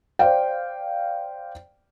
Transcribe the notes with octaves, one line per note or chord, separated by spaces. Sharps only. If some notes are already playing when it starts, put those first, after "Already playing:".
C5 D5 F5 G5